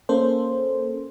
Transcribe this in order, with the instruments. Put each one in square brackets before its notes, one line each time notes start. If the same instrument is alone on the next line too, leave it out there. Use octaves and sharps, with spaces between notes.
[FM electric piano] A#3 C#4 A4 C5